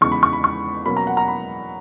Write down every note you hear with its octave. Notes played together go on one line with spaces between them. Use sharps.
E2 C#3 G#3 D#4 C#6
B5
C#6
B5
C#6
B2 F#3 A#3 C#4 B5
A#5
F#5
A#5
B5